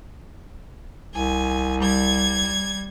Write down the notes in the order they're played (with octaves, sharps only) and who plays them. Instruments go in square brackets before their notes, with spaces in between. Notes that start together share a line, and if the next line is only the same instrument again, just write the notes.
[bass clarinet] C2 [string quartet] G#5
[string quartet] G3 G#6